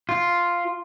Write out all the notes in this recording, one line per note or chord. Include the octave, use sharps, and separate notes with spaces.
F4